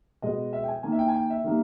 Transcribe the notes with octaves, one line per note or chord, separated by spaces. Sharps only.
B2 G#3 B3 D#5
E5
G5
G#5
D#3 A#3 G#5
E5
G5
G#5
G5
E5
D#3 G3 A#3